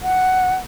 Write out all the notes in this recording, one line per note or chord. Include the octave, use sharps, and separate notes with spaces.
F#5